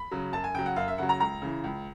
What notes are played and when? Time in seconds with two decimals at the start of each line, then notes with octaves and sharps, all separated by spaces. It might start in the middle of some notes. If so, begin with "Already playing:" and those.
Already playing: B5
0.11 C#3 F#3
0.33 F#2 A5
0.44 G#5
0.55 C#3 F#3 G5
0.66 F#5
0.76 F#2 F5
0.88 E5
0.98 C#3 F#3 F#5
1.09 A#5
1.20 C#2 A#5
1.42 C#3 E3
1.64 C#2